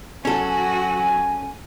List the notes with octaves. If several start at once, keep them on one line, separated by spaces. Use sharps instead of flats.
F#3 C#4 F#4 A4 G#5